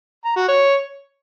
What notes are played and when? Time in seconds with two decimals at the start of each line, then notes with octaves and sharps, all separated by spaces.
0.25 A#5
0.36 F#4
0.48 C#5